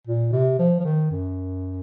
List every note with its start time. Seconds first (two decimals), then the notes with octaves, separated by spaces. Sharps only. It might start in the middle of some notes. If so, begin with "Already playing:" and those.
0.07 A#2
0.32 C3
0.59 F3
0.80 F3
0.85 D#3
1.11 F#2